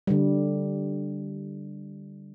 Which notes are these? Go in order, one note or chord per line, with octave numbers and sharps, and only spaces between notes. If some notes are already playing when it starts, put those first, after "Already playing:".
D3 G3